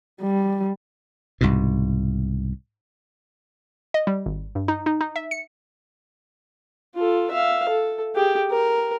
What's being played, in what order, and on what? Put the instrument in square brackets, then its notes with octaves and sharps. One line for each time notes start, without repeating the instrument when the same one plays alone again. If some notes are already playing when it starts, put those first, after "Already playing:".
[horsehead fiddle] G3
[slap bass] C2 G#2 B2
[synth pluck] D#5
G3
G#1
G2
D#4
D#4
D#4
E5
C#7
[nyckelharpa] F4 A4
E5 F5
A4
G4 G#4
A#4